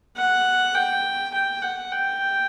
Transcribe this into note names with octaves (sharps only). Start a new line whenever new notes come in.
F#5
G5
G5
F#5
G5